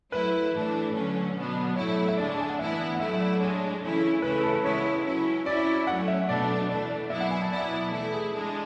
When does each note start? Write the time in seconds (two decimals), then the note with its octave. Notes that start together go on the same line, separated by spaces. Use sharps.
0.12 F#3 A3 E4 B4
0.54 A2 E3 A3 D4
0.94 D3 F#3 A3 C#4
1.35 B2 F#3 B3 D4
1.76 A2 F#3 A3 E4 C#5
2.08 E5
2.17 D3 G#3 D4 D5
2.40 G#5
2.49 F#5
2.59 A2 E3 B3 E4 E5
2.95 F#5
3.00 F#3 A3 E4 E5
3.20 D5
3.40 A2 G#3 D4 C#5
3.82 C#3 E3 A3 C#4 E4
4.22 C#3 E3 A3 C#4 E4 B4
4.43 A4
4.63 C#3 G#3 B3 E4 C#5
5.05 F#3 C#4 E4
5.45 F#3 C#4 E4 D5
5.87 F#3 A3 C#4 F#5
6.08 E5
6.28 B2 F#3 A3 D4 D5
6.69 E3 A3 D4 D5
6.89 D5
7.10 B2 F#3 B3 E4 E5
7.21 F#5
7.31 G#5
7.41 A5
7.52 B2 F#3 B3 E4 D5
7.92 E3 A3 E4 A4
8.13 G#4
8.33 G#3 D4